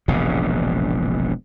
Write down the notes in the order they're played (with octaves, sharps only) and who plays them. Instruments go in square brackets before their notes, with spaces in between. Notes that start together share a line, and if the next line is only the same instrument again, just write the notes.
[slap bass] E1 A#1 G2 C#3